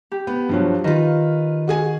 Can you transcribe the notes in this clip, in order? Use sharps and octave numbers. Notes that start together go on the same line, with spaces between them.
G4
B3
G2 F3 F#3
D#3 F4 B4
F#4 G#4 G#5